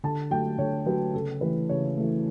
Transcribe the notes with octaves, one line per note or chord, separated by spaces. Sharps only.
D3 A5
F#3 A3 G5
D3 C#5
F#3 A3 B4
C#3 A4
E3 A3 B4
C#3 C#5
E3 A3